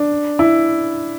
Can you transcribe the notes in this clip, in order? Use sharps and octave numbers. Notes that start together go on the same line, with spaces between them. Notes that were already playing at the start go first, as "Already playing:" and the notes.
Already playing: D4
E4